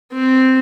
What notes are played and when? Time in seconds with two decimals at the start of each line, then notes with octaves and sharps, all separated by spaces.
0.12 C4